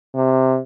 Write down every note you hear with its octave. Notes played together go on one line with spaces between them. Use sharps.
C3